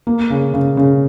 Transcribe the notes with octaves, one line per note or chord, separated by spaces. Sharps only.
A#3
C#3
C#3
C#3